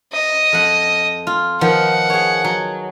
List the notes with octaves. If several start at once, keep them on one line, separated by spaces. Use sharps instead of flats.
D#5
F2 F#5
F4
D#3 F3 B3 F#5
G#4 C#5
F#3